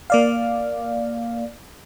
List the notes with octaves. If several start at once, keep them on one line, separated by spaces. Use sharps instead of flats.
A#3 D5 F5